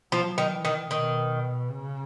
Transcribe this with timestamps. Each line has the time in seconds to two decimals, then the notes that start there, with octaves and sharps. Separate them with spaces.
0.12 F3 F#3
0.38 D#3
0.51 E3
0.65 D#3
0.91 B2 D#3
1.71 C#3